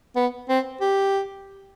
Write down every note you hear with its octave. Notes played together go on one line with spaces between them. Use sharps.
B3
C4
G4